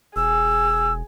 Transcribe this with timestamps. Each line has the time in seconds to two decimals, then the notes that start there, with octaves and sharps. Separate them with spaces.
0.16 E1 G#4 E6